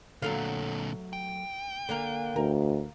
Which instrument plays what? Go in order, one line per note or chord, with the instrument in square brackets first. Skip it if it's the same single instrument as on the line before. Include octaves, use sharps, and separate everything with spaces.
[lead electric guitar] A#2 D3 [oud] F#3 A3 F5
[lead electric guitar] G5
[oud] D3 A#3 A#4
[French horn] D2 [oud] A#4